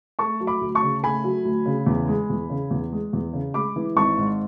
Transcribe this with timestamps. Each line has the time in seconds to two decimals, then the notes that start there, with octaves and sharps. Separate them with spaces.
0.19 A3 A5 C#6
0.40 F#3
0.47 B5 D6
0.61 D2
0.75 A5 C#6
0.82 C#3
1.03 A3 G#5 B5
1.24 F#3
1.45 D2
1.66 C#3
1.87 E2
2.08 G#3
2.30 E2
2.50 C#3
2.71 E2
2.92 G#3
3.13 E2
3.33 C#3
3.54 G#3 B5 D6
3.76 E3
3.96 G#1 A5 C#6
4.18 G#2